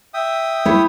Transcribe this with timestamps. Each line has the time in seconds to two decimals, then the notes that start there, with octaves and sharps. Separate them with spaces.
0.14 E5 G5 D#6
0.65 E4 C#5